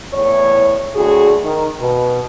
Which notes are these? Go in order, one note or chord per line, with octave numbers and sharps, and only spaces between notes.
E2 A2 C#5
D2 A2 F#4 G#4
D#3
B2